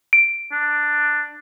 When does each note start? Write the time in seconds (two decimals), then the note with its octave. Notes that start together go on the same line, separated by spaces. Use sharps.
0.13 D7
0.52 D4